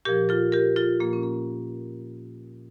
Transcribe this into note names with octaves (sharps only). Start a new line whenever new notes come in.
A#2 F3 G4 A#4
F4 A4
G4 A#4
F4 A4
A#2 F3 A#3
C#4
A#3